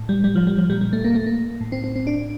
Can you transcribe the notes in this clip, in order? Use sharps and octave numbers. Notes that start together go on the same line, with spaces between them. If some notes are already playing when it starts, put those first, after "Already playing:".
Already playing: A2
G3
G3
F3
G3
F3
A#2 G3
G3
A3
A#3
A3
A#3
A2
C4
C4
C4
D4